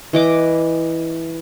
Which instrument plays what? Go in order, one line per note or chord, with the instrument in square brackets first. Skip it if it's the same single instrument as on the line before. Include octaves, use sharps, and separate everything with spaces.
[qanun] E3 D#5 D6